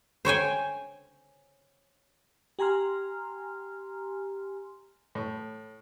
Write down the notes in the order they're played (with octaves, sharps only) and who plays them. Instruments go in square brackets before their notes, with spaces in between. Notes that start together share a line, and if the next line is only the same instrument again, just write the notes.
[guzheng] C5 C#5 G5 G#5
[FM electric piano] G4 G#5 A#5 C6 F6
[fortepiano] A2